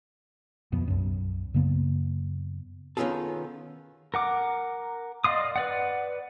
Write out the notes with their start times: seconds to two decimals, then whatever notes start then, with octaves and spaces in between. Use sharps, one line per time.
0.72 D1 F2 B2 B3
0.88 B1 F#2
1.54 F#2 C#3 A#3 B3
2.97 D#3 B3 C#4 F4 G#4 A4
4.14 A#4 F#5 D6
5.24 D5 D#5 F5 C6 D#6
5.56 B4 D5 F#5